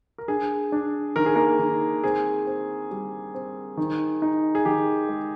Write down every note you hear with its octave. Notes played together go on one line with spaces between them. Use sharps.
A#4
D4 G#4
D4
D#3 A#4
G#4
A#3 A#4
D#3
C4 G#4
C4
G3
C4
D#3
D#4
G#4
D#3 G4
G#3